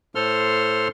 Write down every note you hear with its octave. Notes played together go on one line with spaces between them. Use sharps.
A2 A4 C5 C6 F6